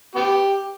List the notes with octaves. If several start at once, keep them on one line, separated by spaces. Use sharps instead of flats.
B3 G4